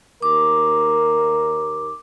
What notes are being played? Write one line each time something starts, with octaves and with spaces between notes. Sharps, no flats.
D#2 A#4 D6